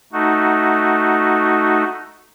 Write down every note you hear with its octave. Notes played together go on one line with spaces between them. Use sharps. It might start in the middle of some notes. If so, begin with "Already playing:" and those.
A3 D#4 F#4